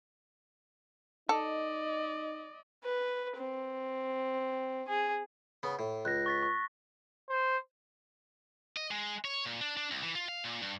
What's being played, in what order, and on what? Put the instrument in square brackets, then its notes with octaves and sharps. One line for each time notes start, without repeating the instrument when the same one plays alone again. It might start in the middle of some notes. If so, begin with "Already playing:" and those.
[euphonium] D#4 [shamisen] A4 [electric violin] D5 D#5
[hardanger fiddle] B4
C4
G#4
[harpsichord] C#3 B3
A2
[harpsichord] C#2 [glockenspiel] F#6 A#6
[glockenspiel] C#6 A6 B6
C#6
[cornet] C5
[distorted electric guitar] D#5
G#3
C#5
A#2
D4
D4
C2
E3
F4
F5
A#2
G2